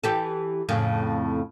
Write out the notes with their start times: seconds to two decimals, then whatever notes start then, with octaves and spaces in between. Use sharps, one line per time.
0.04 E3 G4 A4
0.69 F2 A2 C#3